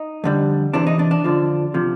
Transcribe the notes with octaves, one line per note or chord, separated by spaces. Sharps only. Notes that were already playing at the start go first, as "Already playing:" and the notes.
Already playing: D#4
F2 D3 G3
E2 C3 E3 D4
D#4
D4
D4
F2 D3 F3
C3 F3